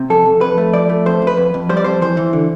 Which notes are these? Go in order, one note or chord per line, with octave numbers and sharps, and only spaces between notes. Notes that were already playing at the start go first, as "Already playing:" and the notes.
Already playing: C3
F2 A4
F2
F2 B4
A3
F3 D5
A3
F2 C5
F2
B4
F2
F2
G3 C5
D5
F2 C5
E3 C5
E3
D3